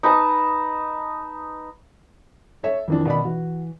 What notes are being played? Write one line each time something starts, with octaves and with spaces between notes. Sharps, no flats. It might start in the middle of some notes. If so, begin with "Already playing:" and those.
D#4 B4 D#5 A5
A4 C#5 E5
F2 D#3 E3 D4
B2 D5 B5
E3 F#4